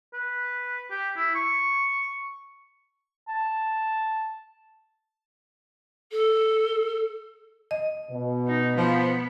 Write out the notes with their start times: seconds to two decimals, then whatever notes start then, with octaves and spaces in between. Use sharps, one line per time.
0.13 B4
0.91 G4
1.16 E4
1.35 C#6
3.28 A5
6.11 A4
7.71 D#5
8.11 B2
8.47 D#4
8.77 F3 B3